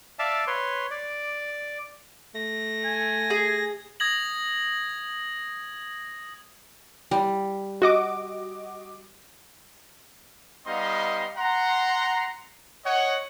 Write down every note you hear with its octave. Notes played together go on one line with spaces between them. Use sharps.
D5 E5 F5 A5
B4 C#5 C6
D5
A3 A#6
G#5
G#4
D#6 G#6 A#6 F#7
G3
F#4 D#5 D6
G3 B3 D#4 D#5 F5 C6
F#5 A#5 C6
C#5 D#5 F#5